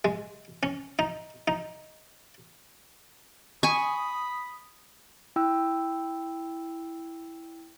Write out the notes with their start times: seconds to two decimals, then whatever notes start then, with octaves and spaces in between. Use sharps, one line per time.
0.05 G#3
0.63 C#4
0.99 D#4
1.48 D#4
3.63 G#5 B5 C#6 D#6
5.36 E4 G5 E6